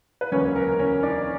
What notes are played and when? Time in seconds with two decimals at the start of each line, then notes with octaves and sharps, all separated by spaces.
0.21 B4
0.32 E1 D2 C#3 F#3 A#3 C#4 C#5
0.56 A#4
0.79 C#4 C#5
1.03 D4 D5